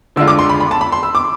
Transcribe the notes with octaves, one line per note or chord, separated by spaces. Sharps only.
D2 D3 G#3 D4 F4 E6
D6
C6
B5
B5
A5
B5
C6
E6
D6